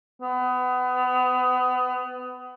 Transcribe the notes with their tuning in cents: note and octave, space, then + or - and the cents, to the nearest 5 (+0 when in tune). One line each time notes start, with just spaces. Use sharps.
B3 +25